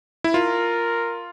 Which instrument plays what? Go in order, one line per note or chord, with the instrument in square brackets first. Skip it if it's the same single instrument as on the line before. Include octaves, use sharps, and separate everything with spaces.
[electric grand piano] E4
[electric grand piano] F4 [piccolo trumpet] A#4